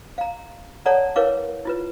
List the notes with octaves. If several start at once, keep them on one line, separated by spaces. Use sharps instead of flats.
F5 A#5
A4 C#5 D5 F#5 A5 A#5
E4 A#4 B4 C#5 F5 D6
E4 F4 B4